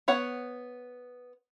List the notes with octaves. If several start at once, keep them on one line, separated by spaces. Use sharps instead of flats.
B3 C#5 F#5